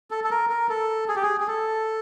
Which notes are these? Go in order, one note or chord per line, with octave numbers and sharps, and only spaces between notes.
A4
A4
A#4
A#4
A4
G#4
G4
G#4
G#4
A4